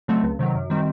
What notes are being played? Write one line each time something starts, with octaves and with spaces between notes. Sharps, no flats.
C#3 F#3 A3 C4
C#2
C3 D#3 F#3
F#2
D#3 G3 C4